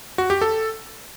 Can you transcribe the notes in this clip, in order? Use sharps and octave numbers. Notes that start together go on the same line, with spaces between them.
F#4
G4
A4